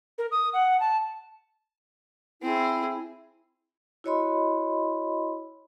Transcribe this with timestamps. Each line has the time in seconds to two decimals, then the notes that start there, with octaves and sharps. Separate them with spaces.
0.18 A#4
0.31 D#6
0.53 F#5
0.80 A5
2.42 C4 E4 G#4
4.04 E4 F#4 C#5 D#5 B5 C6